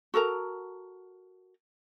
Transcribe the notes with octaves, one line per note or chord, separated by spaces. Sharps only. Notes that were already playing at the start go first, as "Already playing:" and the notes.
F#4 A4 A#4 A#5